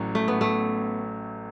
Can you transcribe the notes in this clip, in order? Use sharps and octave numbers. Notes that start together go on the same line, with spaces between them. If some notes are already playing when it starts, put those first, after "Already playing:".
Already playing: A1 A2 E3 F#3 C#4
A3
B3
A3